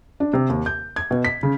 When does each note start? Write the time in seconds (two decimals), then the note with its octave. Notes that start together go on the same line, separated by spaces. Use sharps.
0.20 D4
0.33 C3
0.49 D#2
0.66 G6
0.96 G#6
1.11 B2
1.25 B6
1.43 C#3